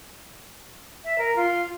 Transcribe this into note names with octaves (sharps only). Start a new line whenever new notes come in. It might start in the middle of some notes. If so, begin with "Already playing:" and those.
E5
A#4
F4